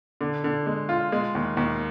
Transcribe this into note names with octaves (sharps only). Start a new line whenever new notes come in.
D3
D3
G#3
F4
G#3
D#2
D#2